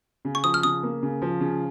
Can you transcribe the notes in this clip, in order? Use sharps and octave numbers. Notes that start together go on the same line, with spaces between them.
C#3
C#6
F3 D#6
F6
C#3 D#6
A#3
C#3
F3
C#3